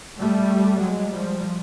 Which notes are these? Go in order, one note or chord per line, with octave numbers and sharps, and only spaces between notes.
G3 A3
F#3 G#3
F3 G3